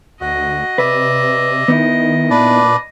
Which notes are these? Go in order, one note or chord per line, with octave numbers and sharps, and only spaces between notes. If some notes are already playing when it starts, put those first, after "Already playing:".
D2 F#4 D#5
C3 B4 D5 E5
D#3 B3 D#4 E4
A#2 D4 B4 D5